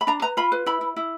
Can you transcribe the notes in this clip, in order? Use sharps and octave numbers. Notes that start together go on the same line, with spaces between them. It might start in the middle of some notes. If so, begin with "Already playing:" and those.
B5
D4 A#5
B4 A#5
F4 B5
B4
E4 B5
E4
E4